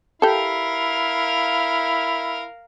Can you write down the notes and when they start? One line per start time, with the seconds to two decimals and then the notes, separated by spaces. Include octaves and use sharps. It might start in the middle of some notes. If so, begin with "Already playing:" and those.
0.22 E4 G4 A4 A#4 F5